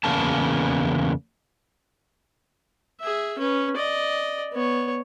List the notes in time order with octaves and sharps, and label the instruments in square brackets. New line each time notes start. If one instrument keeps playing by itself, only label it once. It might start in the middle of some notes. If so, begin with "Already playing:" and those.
[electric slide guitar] E2 C#3 A#3 A5
[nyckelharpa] G#4 E5
C#4 B4
D5 D#5
B3 C#5